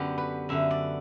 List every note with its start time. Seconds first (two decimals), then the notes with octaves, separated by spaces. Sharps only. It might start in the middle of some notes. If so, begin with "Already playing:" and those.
Already playing: F#2 D3 B3 G4
0.18 B4
0.49 F#2 D3 E5
0.71 D5